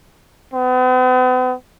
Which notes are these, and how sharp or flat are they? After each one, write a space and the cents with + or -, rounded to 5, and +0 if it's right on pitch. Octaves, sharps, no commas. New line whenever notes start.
B3 +45